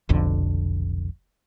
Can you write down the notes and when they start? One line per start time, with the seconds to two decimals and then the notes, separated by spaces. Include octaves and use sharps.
0.09 F1 B1 F2 D3